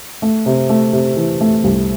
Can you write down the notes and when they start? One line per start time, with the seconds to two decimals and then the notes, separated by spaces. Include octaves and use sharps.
0.22 A3
0.46 C3
0.69 A3
0.93 C3
1.17 E3
1.41 A3
1.64 C2